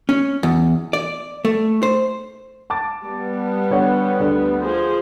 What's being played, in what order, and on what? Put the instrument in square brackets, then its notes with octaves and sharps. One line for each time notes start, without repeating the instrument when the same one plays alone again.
[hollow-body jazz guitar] C#4
E2
D5
A3
C5
[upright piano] A5 D6 A6
[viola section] G3 B3
[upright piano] D3 C#5 F#5
D2 D3
[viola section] F3 G#4 C5